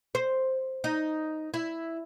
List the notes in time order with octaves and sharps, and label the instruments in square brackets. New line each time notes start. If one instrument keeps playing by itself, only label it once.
[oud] C5
D#4
E4